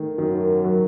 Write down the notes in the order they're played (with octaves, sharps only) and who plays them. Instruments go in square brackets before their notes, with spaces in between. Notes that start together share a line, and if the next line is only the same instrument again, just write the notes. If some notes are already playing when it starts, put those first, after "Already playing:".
Already playing: [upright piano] D#3 A3
[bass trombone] F#2 [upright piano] D#3
[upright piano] F#3